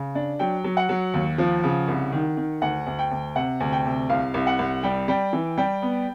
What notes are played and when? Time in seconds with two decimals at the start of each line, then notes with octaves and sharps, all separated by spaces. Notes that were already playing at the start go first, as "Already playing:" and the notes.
Already playing: C#3
0.15 D4
0.39 F#3 G5
0.64 F#3
0.77 F#5
0.89 F#3
1.14 D#2
1.38 F3
1.64 C#3
1.88 C2
2.12 D#3
2.37 D#3
2.62 D2 F#5
2.86 D2
2.99 G5
3.11 D2
3.35 C3 F#5
3.60 D2
3.72 G5
3.85 C3
4.10 C2 F5
4.34 C2
4.47 F#5
4.59 C2
4.83 G3 G5
5.08 G3 G5
5.33 E3
5.58 G3 G5
5.82 B3